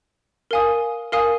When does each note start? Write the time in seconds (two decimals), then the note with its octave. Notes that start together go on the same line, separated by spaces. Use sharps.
0.51 A#4 F5 G#5 D#6
1.12 A#4 F5 G#5 D#6